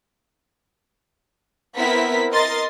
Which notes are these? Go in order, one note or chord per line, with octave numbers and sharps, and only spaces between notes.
B3 C4 E4 A#4 B6
A#4 D#5 C6 A6